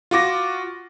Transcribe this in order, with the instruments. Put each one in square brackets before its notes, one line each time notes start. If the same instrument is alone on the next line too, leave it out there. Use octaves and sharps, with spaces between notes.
[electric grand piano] F4 F#4 D6 A#6